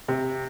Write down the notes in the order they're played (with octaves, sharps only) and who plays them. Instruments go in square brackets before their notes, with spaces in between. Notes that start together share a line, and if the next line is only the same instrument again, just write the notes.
[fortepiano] C3